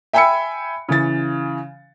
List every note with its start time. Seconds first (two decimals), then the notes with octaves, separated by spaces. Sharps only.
0.13 E5 G5 G#5 B5 E6 C#7
0.89 C#3 E3 A6